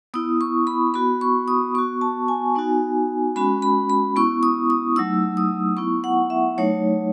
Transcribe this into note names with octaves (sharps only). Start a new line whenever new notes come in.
B3 E4 D#6
C#6
B5
B3 F#4 B5
C#6
D#6
B3 F#4 C#6
A5
G#5
B3 D#4 F#4
G#3 C#4 F#4 B5
B5
B5
B3 E4 C#6
D#6
D#6
F#3 A3 D#4 E6
D#6
B3 E4 C#6
F#5
E5
F#3 A3 D#4 C#5